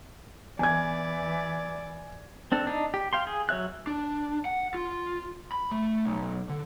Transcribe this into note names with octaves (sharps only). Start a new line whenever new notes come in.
E2 E3 D5 G#5 G#6
C4 D4 A4
D4 D#4
G4
F5 G5 C6
G#4
F#3 C#5 E5 F#6
D4
F#5
F4
B5
A3
B1
D3